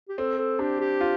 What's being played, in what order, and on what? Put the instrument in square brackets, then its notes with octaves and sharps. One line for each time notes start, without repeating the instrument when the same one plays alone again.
[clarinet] G4
[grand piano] C4 [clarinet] A4
[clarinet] A4
[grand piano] D4 [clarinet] G4
[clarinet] G4
[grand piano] F4